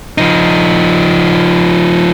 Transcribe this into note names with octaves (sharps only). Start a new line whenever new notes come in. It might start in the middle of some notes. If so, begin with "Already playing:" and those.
F3 D#4